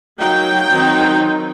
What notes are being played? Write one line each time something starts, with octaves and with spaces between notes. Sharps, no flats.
F#3 A#3 D#4 G5
D#3 F#3 C4 D#4